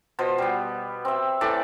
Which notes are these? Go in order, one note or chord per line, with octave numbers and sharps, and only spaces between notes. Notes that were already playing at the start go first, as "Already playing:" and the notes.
B2 F3 C5
G3 B3
C4 E5
A2 E3 D5 A5